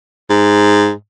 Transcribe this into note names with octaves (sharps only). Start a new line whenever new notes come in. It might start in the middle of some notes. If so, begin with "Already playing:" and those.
G#2